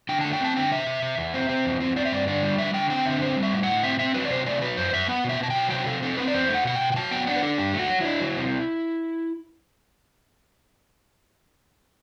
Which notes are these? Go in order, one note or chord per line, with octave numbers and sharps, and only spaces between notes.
D3 G5
A3 A5
G5
C4 A5
D3 G5
C3 E5
C3
C3
E2
C4
C4
E2
C4
C4 D5
E5
G2 D5
D3 D5
G3
D3 E5
D3 G5
C4 G5
D3 E5
C4 C5
G3
E5
A2
A2 F#5
C4 E5
C4 E5
F#3 B4
D5
C3 C5
A3 D5
F#3 B4
F#2 C5
F#2 E5
B3 F#5
B2 E5
B2 A5
F#3 G5
C3 G5
C3 A4
C4 A4
C4 B4
D5
E2 C5
A3
F#5
B2 F#5
G5
B2
G5
F#3 A5
B3 G5
D4 F#5
B4
D4 A4
G2 G4
A3
F#4
F#3
D4 E4
F#3
C3